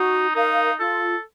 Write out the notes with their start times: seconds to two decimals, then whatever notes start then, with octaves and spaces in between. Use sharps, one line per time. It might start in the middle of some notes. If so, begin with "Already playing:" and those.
Already playing: D#4 F#4
0.35 D#4 A#4 F5
0.79 F4 A4